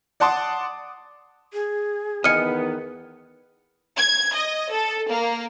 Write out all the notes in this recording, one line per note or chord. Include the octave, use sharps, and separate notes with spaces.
D5 F#5 A5 C6 D6 D#6
G#4
E2 D#3 B3 D#5 G#5 F6 C#7
G#6
D#5
A4
A#3